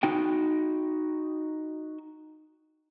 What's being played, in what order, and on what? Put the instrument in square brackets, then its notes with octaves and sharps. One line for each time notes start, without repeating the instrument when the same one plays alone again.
[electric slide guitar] D#4 F#4 G5